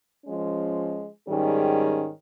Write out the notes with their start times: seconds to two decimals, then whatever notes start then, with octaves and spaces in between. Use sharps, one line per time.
0.24 F3 G#3 C#4
1.27 G#2 D#3 G3 C#4 G#4